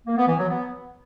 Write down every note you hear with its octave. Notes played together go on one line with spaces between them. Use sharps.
A#3
B3
E3
F#3
B3